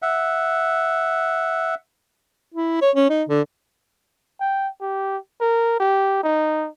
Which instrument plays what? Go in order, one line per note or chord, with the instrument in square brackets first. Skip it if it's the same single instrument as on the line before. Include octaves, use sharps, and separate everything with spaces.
[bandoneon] E5 F#5
[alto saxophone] E4
C#5
C#4
D#4
D3
[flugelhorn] G5
G4
A#4
G4
D#4